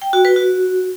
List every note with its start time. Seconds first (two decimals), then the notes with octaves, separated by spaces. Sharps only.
0.02 G5
0.13 F#4
0.25 B4
0.36 F#4